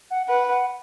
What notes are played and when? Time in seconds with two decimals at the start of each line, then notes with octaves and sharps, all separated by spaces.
0.11 F#5
0.28 B4 F#5
0.50 F#5